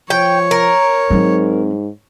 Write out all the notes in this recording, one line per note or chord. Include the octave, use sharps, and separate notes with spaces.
F3 C#5 G5
A#4
G#2 F#3 C4